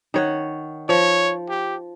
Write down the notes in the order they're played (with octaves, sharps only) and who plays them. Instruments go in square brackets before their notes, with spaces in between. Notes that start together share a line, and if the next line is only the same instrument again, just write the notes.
[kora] D#3 C#5 F#5
[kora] F3 [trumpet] C#5
[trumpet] G4